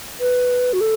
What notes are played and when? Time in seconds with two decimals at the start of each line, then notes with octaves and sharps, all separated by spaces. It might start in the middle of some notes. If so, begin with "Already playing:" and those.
0.20 B4
0.73 F#4
0.81 A4